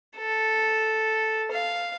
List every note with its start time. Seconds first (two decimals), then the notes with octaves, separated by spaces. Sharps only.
0.17 A4
1.51 F5